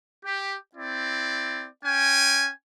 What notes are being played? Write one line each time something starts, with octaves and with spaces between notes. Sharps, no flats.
G4
C4 E4 D5
C#4 G5 G#5